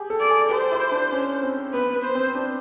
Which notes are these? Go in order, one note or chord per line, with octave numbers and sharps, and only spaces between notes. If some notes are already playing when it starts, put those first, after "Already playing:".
Already playing: G4 G#4
A4
D5
G#4
G4 C5
E4
D4
C#4
C4
B3 B4
B3
C5
C4
D4